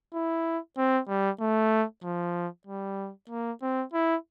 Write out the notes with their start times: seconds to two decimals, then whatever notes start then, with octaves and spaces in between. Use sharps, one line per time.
0.14 E4
0.77 C4
1.08 G3
1.40 A3
2.03 F3
2.67 G3
3.30 A#3
3.62 C4
3.93 E4